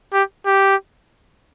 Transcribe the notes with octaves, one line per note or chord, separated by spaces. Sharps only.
G4
G4